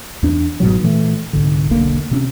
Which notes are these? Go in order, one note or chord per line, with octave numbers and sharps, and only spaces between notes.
E2 D4
G1 G#2 B2 F#3
A#2 E3 G#3 A3
C2 G#2 D3
E1 B1 D3 A#3
C3 C4 C#4